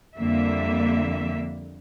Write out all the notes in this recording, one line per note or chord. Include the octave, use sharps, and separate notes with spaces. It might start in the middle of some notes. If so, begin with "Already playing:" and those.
F2 D3 G3 A#3 E5